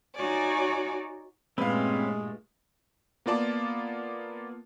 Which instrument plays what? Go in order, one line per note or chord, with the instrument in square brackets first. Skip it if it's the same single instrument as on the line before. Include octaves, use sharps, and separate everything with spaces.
[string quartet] D#4 F#4 C#5 D5 G#5
[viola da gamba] G2 A#2 A3 [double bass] G#3 [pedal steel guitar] C4 C#4 [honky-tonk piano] B4 F5
[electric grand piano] A#3 B3 F4 D5 A5